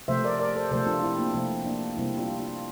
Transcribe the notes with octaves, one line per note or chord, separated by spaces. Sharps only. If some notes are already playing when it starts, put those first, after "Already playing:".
C3 F3 A3 C5 E5
A#4 D5
A#4 D5
A4 C5
C3 F3 A3 A4 C5
D4 F4
C4 E4
A#3 D4
C3 F3 A3 C4
A#3 D4
C3 G3 A#3 C4 E4
D4 F4
D4 F4